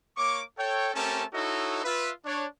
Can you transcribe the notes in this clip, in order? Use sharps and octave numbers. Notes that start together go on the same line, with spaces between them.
A#3 C#5 C#6 D6
A4 C#5 G5
A3 C4 C#4 G4 A#4 A5
D#4 E4 F#4 A4 C#5 D#5
F4 B4 E5
D4 C#5